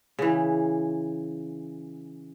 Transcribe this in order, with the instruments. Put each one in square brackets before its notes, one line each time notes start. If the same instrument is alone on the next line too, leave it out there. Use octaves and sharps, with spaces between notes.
[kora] C#3 E3